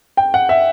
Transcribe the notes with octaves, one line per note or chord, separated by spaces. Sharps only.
G5
F#5
E5